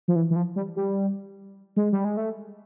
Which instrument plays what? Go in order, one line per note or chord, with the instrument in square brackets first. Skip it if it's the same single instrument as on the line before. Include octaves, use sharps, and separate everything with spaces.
[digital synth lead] F3
E3
E3
F3
G3
G3
G#3
G3
G#3
A3